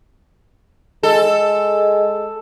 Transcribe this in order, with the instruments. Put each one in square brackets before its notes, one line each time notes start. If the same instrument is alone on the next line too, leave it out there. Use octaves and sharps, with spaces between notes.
[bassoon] G#3 [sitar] A4